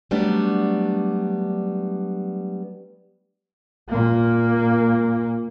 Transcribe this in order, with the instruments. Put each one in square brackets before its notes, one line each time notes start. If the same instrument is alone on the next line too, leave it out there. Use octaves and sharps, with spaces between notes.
[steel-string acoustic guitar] F#3 G3 A3 B3 D4
[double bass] A#2 A#3